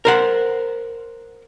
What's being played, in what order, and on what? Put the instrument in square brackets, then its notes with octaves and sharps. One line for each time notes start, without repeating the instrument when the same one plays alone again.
[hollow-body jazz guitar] A#4 C5 F#5